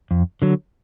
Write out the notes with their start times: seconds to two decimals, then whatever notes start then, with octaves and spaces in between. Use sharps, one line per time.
0.11 F2
0.42 D3 F#3